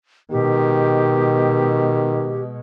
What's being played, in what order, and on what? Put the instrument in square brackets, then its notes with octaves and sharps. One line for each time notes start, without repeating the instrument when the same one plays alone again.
[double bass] B2 G#3 [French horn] D#3 [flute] G4